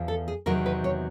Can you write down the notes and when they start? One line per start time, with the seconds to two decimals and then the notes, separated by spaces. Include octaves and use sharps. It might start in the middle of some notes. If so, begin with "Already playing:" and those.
Already playing: E2 F3
0.08 A4
0.28 G#4
0.46 E2 C3 D#3 F#3 A#4
0.66 B4
0.84 C#5